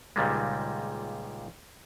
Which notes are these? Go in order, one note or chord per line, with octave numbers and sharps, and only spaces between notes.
C#2 A#2 D#3 G3 G#3